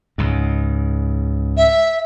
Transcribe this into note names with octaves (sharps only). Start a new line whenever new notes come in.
C#2 G#2
E5